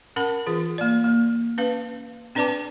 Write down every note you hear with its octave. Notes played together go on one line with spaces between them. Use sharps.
C#4 A#4 F#5 B5
E3 F4 G#4
A#3 D5
A#3
C#4 B4 F5
C4 D4 B4 D5 A5 D6